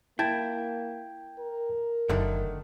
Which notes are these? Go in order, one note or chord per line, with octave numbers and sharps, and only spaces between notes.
A#3 E4 G5 A5 G#6
A#4
F#1 D3 D#3 A3